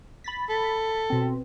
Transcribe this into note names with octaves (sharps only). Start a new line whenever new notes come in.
B5 A6 B6
A4
B2 C4